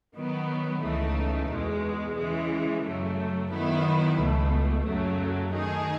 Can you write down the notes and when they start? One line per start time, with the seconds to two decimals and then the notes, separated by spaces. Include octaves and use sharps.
0.15 D#3 F#3 B3
0.82 C#2 C#3 E3 A3 D#4
1.49 E2 B2 G#3
2.16 C#3 E3 G#3
2.84 F#2 C#3 F#3 A3
3.51 D#3 F#3 B3 E4
4.18 C#2 B2 A3
4.85 F#2 C#3 F#3 A3
5.52 D#3 A3 D#4 G#4